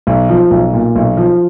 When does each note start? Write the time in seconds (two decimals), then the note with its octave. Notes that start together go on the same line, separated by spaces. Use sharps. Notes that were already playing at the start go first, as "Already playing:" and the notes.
0.07 B1
0.29 F3
0.51 B1
0.73 A#2
0.95 B1
1.17 F3